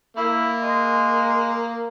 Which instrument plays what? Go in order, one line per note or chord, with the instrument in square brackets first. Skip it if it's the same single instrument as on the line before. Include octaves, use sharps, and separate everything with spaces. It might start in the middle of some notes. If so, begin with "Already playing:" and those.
[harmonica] A#3 [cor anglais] E4
[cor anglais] G#3